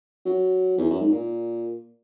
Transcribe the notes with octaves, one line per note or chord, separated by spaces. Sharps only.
F#3
E2
F#2
G#2
A#2